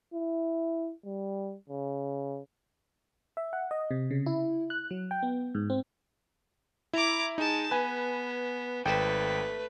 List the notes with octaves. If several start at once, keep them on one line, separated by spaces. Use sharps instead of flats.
E4
G3
C#3
E5
F#5
D#5
C3
C#3
E4
F#6
F#3
G5
B3
G#2
C4
E4 A#5 D6
G#3 D#4 A5
B3 B4 G#5
G#1 A3 B4 G5